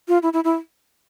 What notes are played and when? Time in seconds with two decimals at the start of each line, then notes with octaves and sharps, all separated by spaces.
0.08 F4
0.23 E4
0.33 E4
0.44 E4